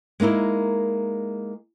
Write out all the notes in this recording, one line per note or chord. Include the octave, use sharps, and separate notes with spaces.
G#3 A#3 D#4 E4 A#4